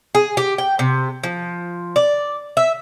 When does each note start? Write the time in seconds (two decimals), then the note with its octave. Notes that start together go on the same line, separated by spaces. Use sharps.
0.15 G#4
0.37 G4
0.58 G5
0.79 C3
1.23 F3
1.96 D5
2.57 E5